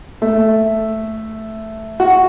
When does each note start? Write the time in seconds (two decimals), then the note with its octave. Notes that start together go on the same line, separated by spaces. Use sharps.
0.22 A3
2.00 F#4